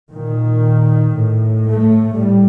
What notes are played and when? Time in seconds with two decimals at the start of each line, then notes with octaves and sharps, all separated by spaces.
0.11 A#2 D#3
1.15 A2
1.66 A3
2.17 A2 G3